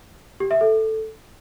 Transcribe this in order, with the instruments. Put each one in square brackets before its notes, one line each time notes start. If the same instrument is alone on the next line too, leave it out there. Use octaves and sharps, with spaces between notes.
[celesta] G4
E5
A4